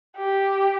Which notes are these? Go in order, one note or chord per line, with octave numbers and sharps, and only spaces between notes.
G4